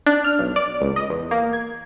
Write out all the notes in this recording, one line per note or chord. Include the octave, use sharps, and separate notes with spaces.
D4
F6
B1
D5
C#2
D#5
E2
A#3
G#6